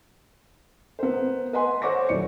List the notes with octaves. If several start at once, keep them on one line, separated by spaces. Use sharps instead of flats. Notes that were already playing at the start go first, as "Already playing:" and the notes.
B3 A#4 C5
B4 D#5 F#5 G#5 C6
C5 C#5 F#5 C#6 D6 A#6
D#1 F#3 E4 D5 C#7